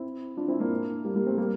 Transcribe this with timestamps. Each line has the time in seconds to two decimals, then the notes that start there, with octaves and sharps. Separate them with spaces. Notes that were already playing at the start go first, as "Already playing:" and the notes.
Already playing: C4 E4
0.37 D4 F4
0.48 C4 E4
0.60 A#3 D4
1.05 G3 A#3
1.15 G3 A#3
1.26 A3 C4
1.38 G3 A#3